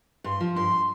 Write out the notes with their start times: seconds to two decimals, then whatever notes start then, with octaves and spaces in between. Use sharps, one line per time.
0.24 G2 C6
0.40 F3
0.56 G2 C6